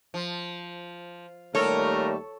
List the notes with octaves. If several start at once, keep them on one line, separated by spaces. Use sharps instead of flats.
F3
D#2 G3 A3 F4 A4 A#4 C#5